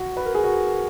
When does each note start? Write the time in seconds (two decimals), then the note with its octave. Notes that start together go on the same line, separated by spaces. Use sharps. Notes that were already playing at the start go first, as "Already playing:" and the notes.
Already playing: F#4
0.17 B4
0.25 A#4
0.35 G#4
0.44 F#4